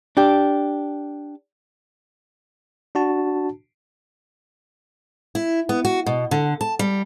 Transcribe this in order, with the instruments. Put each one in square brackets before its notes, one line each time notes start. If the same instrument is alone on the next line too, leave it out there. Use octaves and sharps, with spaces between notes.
[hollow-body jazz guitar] D4 G4
[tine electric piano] D4 F#4 A5
[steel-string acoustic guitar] E4
B3
F#4
B2
D3
A5
G3